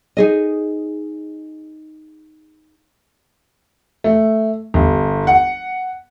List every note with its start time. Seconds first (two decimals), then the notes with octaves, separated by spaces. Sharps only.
0.17 D#4 G#4 D#5
4.04 A3
4.74 G1
5.27 F#5